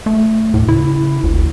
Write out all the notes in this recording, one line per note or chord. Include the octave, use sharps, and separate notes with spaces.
A3
D#2 A2
C#3 E4
G1 D2